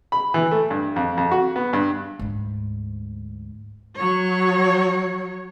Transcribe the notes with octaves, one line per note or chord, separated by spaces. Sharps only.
B5
E3
A3
G2
F2
F2
F#4
B3
G2
D2 G#2
F#3 C#5